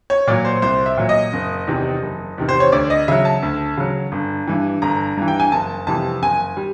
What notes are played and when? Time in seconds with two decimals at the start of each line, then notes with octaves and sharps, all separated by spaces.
0.10 C#5
0.27 A#2 F#3 D5
0.45 C5
0.62 C2 C5
0.86 E5
0.97 A#2 F#3
1.09 D#5
1.33 F#1
1.67 E2 C3 D#3
2.02 F#1
2.38 E2 C3 D#3
2.49 C5
2.60 C#5
2.72 D2 D5
2.90 D#5
3.08 C#3 F#3 E5
3.25 A5
3.42 D2
3.77 C#3 F#3
4.12 G1
4.47 G2 E3
4.82 G1 A#5
5.17 G2 E3
5.28 G5
5.40 G#5
5.52 F#1 A5
5.87 F2 C3 E3 G3 A5
6.22 F#1 G#5
6.57 G3